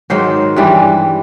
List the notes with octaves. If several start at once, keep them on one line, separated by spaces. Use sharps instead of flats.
G#2 D#3 F#3 C5
G2 E3 G3